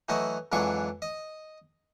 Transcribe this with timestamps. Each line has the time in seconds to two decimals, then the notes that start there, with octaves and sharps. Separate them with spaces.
0.09 E3 F#3 A3 F#4 D#5
0.52 F2 G#2 E3 F#3 D4 C#6
1.02 D#5